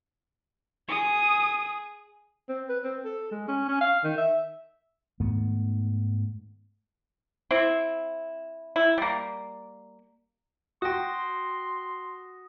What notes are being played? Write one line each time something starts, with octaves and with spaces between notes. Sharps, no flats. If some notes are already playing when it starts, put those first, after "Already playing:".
G#4 D#6
C4
B4
C4
A4
G#3
C#4
C#4
F5
D#3
E5
G#2 D#3 A3 B3
C4 E4
E4
G3 A#3
F#4 G5 C6 D#6 A#6